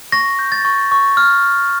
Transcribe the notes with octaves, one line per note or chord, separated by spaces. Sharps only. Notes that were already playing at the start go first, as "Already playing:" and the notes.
C#6 A#6
G6
A6
C#6
C#6
F6